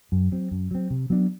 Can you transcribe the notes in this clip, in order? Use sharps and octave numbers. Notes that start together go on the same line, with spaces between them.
F#2
F#3 C4
F#2
F#3 C4
C3
F#3 B3 D4